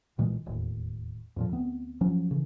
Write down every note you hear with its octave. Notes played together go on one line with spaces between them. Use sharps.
B1 A#2 E3 G#3
E1 D#2 A2
F2 A#2 F3
D2 B3 C4
G1 F3 F#3 C#4
C#3 E3